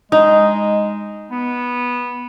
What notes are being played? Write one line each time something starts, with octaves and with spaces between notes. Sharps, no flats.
G#3 D#4
B3